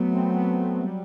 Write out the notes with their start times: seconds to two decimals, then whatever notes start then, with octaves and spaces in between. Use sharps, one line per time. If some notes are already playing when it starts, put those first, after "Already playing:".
Already playing: F#3 A3 B3
0.12 C4
0.35 B3
0.59 A3
0.82 G3